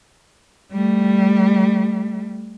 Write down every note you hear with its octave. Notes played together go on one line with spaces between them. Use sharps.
G3 A3